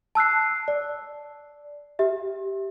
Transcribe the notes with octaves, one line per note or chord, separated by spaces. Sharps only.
A5 E6 F#6 C7
D5
G4 E5